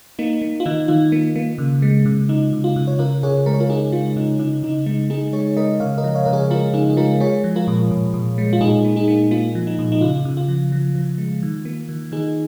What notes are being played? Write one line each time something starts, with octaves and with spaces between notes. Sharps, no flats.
A#3 D#4
A#3
F4
D#3 D#4
D#3 F4
A#3
A#3
C#3
G#3
C#3
C#3 D#4
C#3
F4
C#3
C#5
C#3 F4 A#4
C#3 G#4 C#5
G#3 A#4
C#5
F4 A#4
C#3 D#4 G#4
G#3 F4
C#3 D#4
C#3 D#4
C#3 D#4
G#3 D#4
G#3 D#4 G#4
G#3 G#4 C#5
G#3 A#4 D#5
C#3 C#5 F5
A#4 D#5
F3
C#5 F5
C#3 A#4
G#4 C#5
G#3 F4 A#4
C#3 D#4 G#4
G#4
G#3 F4 A#4
G#3 G#4 C#5
F3
F4 A#4
A#2
A#2
A#2
G#3
F4
A#2 D#4 G#4
A#3
D#4 G#4
A#3
A#3 F4
F3
D#4
A#2
D#4
C#3 F4
C#3
F4
F3
F3
F3
G#3
D#3
A#3
D#3
D#3 D#4 G#4